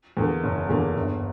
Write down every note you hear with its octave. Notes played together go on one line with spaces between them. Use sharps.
E2 D3 A#3
F#1
E2 D3 A#3
G1